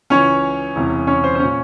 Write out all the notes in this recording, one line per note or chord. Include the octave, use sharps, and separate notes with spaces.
C#2 C#3 E3 C#4 C#5
E1 E2 C3
C#4 C#5
C5
C5
A#2 C#4 C#5